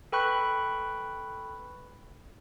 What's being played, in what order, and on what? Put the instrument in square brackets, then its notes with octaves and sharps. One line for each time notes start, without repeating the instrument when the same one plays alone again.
[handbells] A4 B4 G5 B5 C#6 F#6